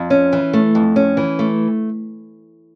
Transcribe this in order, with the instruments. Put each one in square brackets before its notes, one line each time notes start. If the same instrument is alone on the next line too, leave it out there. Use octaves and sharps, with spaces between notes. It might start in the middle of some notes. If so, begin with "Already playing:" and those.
Already playing: [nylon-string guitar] F2
C#4
E3
A3
F2
C#4
E3
A3